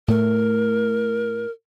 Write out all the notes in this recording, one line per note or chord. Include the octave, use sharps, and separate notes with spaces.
A2 A3 A#4